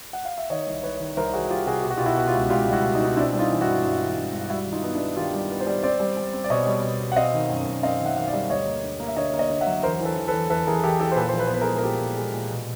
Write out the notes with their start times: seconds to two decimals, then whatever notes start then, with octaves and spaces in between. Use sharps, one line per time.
0.13 F#5
0.25 F5
0.38 E5
0.50 D#3 C#5 D#5
0.67 C2
0.83 C2 B4 C#5
1.00 D#3
1.17 C2 A#4 C5
1.33 D#3 F#4 G#4
1.50 C2 F4 G4
1.66 C3 F#4 G#4
1.84 B2 G4
1.90 F#4
1.97 B2 F4 G4
2.06 E4 F#4
2.17 B2 F#4
2.28 F4 G4
2.33 C#2
2.50 C#2 F4 G4
2.67 G3
2.72 E4 F#4
2.83 B2
2.95 D#4
3.00 B2
3.06 D#4
3.17 C4 D4 E4
3.33 G3
3.39 D#4 F4
3.50 E3
3.61 E4 F#4
3.67 G2
3.84 G2
4.00 E3
4.17 G2
4.33 G2
4.50 G3 E4 F#4
4.67 D#3
4.72 D#4 F4
4.83 B3 D#4
4.95 D4 E4
5.00 B3
5.16 D#3 F4 G4
5.33 G3
5.50 B3
5.61 C5 D5
5.67 G3
5.83 C4 C5 D5
6.00 G3
6.17 G3
6.33 C4
6.44 D5
6.50 B2 C#5 D#5
6.67 G3
6.83 B2
7.00 B2
7.12 F#5
7.16 C4 D#5 F5
7.34 D#3
7.50 F#2
7.67 F#2
7.83 C4 D#5 F5
8.00 D#3
8.05 E5 F#5
8.17 D#3 F5
8.28 D5 E5
8.33 G3
8.50 D2 C#5 D#5
8.66 A#3
8.84 D3
9.00 A#3
9.07 E5
9.16 D3 C#5 D#5
9.33 A#3
9.39 C#5 D#5
9.50 D3
9.61 E5 F#5
9.67 F#3
9.83 E2 A#4 C5
10.00 E3
10.05 A4 B4
10.17 E3
10.28 A4 B4
10.33 E2
10.50 E2 A4 B4
10.67 E2 G#4 A#4
10.83 E2 G4 A4
11.00 E3 G4 A4
11.12 C5
11.16 A#2 A4 B4
11.29 F3 C5
11.39 A4 B4
11.47 C5
11.50 B3 B4
11.61 G#4 A#4
11.67 G#3
11.78 A#4
11.83 A#2 G4 A4
12.00 A#2
12.17 G#3
12.34 A#2
12.50 B2